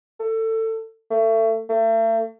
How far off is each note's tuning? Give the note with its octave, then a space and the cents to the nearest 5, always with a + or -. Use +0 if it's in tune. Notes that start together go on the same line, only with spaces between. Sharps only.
A4 +25
A3 +30
A3 +40